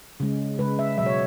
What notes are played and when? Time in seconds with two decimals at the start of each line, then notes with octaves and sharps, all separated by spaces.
0.20 C#3 G#3
0.59 C#3 G#3 B4
0.79 E5
0.97 B2 F#3 E5
1.06 C#5